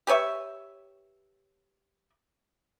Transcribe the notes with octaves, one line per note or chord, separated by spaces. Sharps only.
G4 B4 C#5 E5